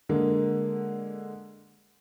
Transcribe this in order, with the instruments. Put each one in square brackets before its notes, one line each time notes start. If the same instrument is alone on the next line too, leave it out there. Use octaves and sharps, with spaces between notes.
[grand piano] D3 G#3 A#3